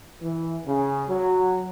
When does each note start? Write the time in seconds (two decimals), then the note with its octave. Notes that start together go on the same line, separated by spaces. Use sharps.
0.22 E3
0.66 C#3
1.10 F#3